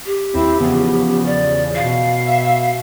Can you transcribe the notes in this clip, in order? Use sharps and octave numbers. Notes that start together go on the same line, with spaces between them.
G4
D#2 C4 E4
E2 C#3 F3 B3
D5
B2 F5
E5